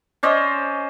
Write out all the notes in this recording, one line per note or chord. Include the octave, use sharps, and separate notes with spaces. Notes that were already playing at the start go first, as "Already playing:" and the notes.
C#4 C5 D5 D#5